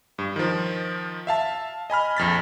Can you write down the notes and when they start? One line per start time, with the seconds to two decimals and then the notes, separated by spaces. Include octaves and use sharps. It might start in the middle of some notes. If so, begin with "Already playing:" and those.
0.18 G2
0.36 D#3 F3
1.27 E5 F5 A5
1.90 D#5 G#5 B5 F6
2.17 A#1 F2 A6 B6